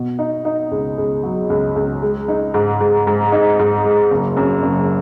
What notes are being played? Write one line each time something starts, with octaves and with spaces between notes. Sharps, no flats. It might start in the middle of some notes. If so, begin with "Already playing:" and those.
Already playing: B2
D#4
D#4
C#2
C#2
F#3
C#2
C#2
G#3
D#4
G#2
G#2
G#2
D#4
G#2
G#3
F#1
F#2
F#1